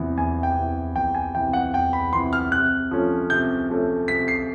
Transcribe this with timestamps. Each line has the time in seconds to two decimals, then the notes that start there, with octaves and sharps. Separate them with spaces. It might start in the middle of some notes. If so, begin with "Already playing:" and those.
Already playing: E2 C3 E3
0.17 E2 G#5
0.43 G5
0.56 C3 E3
0.96 E2 G5
1.15 G#5
1.35 C3 E3 G5
1.53 F#5
1.73 E2 G5
1.93 B5
2.12 C3 E3 C6
2.33 F6
2.52 C3 F#6
2.91 F3 A3 C#4
3.30 C3 G6
3.69 F3 A3 C#4
4.08 C3 B6
4.28 C7